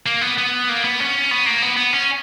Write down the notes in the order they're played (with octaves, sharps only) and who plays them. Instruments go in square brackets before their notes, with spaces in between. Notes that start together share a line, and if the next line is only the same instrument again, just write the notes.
[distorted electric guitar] A#3
B3
B3
A#3
B3
C#4
B3
A#3
B3
B3
C#4